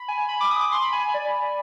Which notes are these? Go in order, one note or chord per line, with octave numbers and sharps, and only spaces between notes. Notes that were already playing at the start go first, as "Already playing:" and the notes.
Already playing: B5
G#5
B5
D6
D#6
D6
C6
B5
G#5
B5
G#5
D5